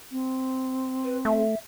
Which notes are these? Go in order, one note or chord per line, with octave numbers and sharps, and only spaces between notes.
C4
B4
A3 E5